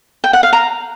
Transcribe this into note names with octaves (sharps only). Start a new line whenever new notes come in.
G5
F#5
F5
A#5